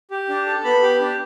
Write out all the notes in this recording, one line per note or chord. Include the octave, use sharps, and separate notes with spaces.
G4
D4
A4
B3 B5
G4
D4